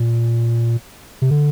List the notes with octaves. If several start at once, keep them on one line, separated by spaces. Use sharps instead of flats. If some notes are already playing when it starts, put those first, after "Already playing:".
Already playing: A#2
C3
D3